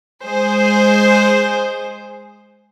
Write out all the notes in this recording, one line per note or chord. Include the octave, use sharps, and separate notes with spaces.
G#3 G#4 C5